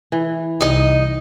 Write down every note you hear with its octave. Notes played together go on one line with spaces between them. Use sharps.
E3
C2 D#4 D#5